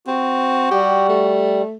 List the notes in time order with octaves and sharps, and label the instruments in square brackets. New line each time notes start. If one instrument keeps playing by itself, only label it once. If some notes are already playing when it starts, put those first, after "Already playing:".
[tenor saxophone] C4 [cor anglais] F#4
[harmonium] G3 [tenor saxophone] G4
[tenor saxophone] A3